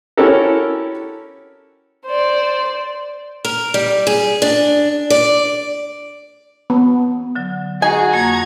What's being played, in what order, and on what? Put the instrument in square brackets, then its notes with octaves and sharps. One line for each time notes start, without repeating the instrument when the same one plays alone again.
[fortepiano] C#4 E4 F#4 G4 A4 A#4
[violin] C5 D5
[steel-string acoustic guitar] A#4
G3
G#4
D4
D5
[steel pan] B3
[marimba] D3 F#3
[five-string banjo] D#4 G#5 [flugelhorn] F#4 [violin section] G#4
[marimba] F2 A#3 [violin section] A#5 G#6